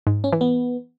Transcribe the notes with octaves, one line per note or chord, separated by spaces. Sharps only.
G#2
C#4
E3
B3